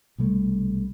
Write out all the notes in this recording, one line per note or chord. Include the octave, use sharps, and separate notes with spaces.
B1 C3 G3 A3